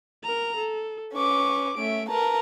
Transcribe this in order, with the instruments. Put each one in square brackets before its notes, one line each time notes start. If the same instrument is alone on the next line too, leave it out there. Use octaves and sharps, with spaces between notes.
[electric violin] A#4 A#5
A4
[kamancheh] C#4 D6 [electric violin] B4 C#6
[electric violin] A3 D7 [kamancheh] C#4 E5
[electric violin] A#4 B4 [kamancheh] A5 A#5